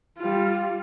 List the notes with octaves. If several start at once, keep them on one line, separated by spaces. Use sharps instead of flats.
G3 F4